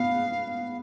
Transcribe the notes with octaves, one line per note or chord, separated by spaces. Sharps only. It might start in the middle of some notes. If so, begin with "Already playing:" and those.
Already playing: B3 F5